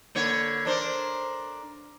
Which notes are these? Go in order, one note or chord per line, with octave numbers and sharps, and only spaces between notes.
D3 A#3 C#5
D4 A#4 C5